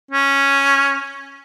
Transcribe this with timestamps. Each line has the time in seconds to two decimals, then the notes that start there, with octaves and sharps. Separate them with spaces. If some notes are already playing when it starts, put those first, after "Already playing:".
0.11 C#4